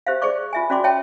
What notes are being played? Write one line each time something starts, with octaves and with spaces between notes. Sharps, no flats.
G4 C5 E5 F5
G#4 C5 D5 C#6 D6
F4 E5 G#5
C#4 F#4 D5 C6 D6
C#5 E5 G5 A5